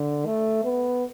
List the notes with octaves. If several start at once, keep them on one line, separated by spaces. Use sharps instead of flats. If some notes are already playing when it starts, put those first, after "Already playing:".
Already playing: D3
A3
B3